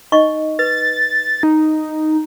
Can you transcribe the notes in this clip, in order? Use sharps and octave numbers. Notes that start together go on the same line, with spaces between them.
D#4 D#5 C#6
B4 A6
D#4